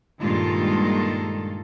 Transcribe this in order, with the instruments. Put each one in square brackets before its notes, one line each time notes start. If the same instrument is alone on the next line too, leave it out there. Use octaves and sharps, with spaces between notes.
[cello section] G2 A#2 D#3 G#3 F4 A4